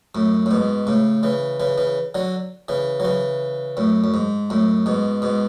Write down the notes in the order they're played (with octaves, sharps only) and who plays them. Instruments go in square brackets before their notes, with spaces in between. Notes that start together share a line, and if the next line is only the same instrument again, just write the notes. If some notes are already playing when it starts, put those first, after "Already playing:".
[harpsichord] F#2 A2
A2
G#2 B2
A2 C#3
C#3 E3
C#3 E3
C#3 E3
D3 F#3
C#3 E3
F#3
C#3 E3
F#2 A2
F#2
G#2
F#2 A2
G#2 B2
G#2 B2